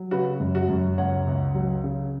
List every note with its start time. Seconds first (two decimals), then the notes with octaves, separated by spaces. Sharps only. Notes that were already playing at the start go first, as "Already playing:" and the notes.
Already playing: F#3
0.11 C#3 F#4 B4
0.40 F#2
0.55 F#4
0.69 F#2
0.98 C#2 C#5 F#5
1.27 C#2
1.55 F#3
1.84 C#3